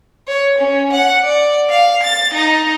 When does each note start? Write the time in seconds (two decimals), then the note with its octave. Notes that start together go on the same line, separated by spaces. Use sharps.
0.28 C#5
0.59 C#4
0.93 F#5
1.24 D5
1.70 F5
2.03 A6
2.34 D#4